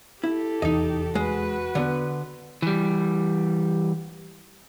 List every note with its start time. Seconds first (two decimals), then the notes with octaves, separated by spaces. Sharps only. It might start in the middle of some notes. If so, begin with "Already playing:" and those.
0.24 E4 G4 A4
0.62 F1 E2 E3 D#4 D#5
1.15 G#3 F#4 B4
1.75 D3 B3
2.62 E3 G3